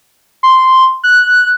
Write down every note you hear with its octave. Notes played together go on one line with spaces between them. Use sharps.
C6
F#6